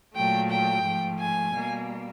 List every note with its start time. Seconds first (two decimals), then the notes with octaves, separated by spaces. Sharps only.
0.14 A#2 F#3 A3 G5
0.49 G5
0.83 G#2 F3 A3
1.18 G#5
1.52 B2 G3 A#3